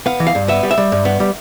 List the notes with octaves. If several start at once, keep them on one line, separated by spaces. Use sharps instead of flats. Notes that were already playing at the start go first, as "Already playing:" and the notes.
B3 F5
E3
F5
G2
B3 E5
G3
E5
G3
G2
B3
G3